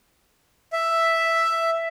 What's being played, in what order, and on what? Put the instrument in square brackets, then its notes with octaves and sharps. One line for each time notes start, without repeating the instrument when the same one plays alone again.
[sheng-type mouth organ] E5